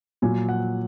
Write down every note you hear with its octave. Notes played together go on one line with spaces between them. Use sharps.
A#2 F#3 G#5
F#5